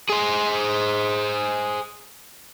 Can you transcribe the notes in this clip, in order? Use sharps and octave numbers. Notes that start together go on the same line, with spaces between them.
G#4 C5